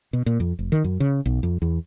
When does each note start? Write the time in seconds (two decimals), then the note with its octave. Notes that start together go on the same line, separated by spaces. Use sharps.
0.13 B2
0.26 A#2
0.40 F2
0.59 F1
0.72 D#3
0.84 F#2
1.00 C#3
1.26 B1
1.43 F2
1.62 E2